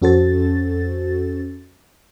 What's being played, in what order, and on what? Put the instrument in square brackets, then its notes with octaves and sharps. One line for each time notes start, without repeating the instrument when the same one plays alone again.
[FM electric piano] F2 C#4 F#4 A4 C5 A6